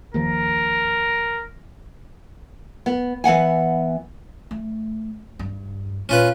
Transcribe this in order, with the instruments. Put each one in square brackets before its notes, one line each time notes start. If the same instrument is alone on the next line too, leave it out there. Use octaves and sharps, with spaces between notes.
[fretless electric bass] D#2 D#3 F3 [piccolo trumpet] A#4
[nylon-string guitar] B3
E3 B3 F#5 G#5
[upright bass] A3
G2
[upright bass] A#2 [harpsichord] C#4 F4 B4